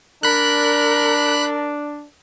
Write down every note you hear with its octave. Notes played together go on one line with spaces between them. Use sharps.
D4 A#4 B5 F#6